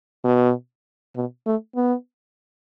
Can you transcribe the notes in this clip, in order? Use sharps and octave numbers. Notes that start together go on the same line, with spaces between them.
B2
B2
A3
B3